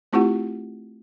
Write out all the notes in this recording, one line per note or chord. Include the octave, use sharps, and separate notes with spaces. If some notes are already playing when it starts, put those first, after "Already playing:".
A3 C4 E4 F4 G4 F#5